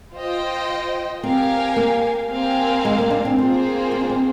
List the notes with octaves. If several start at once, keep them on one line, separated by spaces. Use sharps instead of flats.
F4 C5 D#5 G5
C4 G4 A#4 F5 G#5
A#3
C4 G4 A#4 F5 G#5
G#3
A#3
D4
C4
A#3 C4 F4 G#4 C5
C4
D4
C4